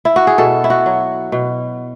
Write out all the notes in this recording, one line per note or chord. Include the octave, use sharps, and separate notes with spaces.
E4
F#4
G#4
B2 A4
E4
F#4
F#3
B2